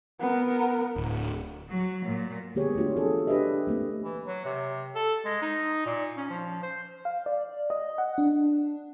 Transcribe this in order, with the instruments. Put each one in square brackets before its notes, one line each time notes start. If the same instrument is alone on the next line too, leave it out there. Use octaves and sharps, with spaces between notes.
[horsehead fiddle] B3 A#4
[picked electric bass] D1
[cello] F#3
A#2
[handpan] D3 A#3 B3 G4 G#4 C#5
A3 D4 F4 F#4
E3 C4 G#4 A4
D4 G4 B4 C5 D#5 E5
A3 A#3 C4
[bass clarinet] E3
F#3
C3
A4
G#3
D#4
A#2
C#4
F3
C5
[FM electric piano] F5
D5
D#5
F#5
D4